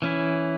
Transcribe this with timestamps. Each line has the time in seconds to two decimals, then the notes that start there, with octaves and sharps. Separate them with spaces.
0.02 E3 C#4 E4